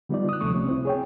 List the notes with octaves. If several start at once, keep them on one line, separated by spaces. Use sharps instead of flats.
D3 G3 B3 D#4 F4 D5
D#6 F#6
D2 C3 F3 A3 C#6 D#6
C2 C3 C#4
C4 E4
G#4 C#5 G5